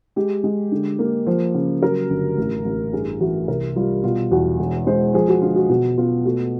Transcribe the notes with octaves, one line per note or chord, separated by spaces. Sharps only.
G#3 G4
G#3
D3
A#3
F3
C#3
F#3 A#4
G1
A1
A1
G2 G#4
E3 F#4
C2 A#4
G3 F4
B2 F4
E2 F#4
E1
G#3 C5
F3 G#4
F#4
D3 F4
F#4
B2 F#4
B3 F4
A3 F#4